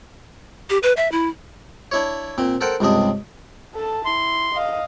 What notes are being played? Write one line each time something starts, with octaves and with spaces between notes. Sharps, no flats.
G4
B4
E5
E4
D4 E4 C#5
A#2 C4
A4 A#4 C5 F#5 G5
C#2 G2 C3 D4 D#5
A4 A5
E4 C6
D#5 F5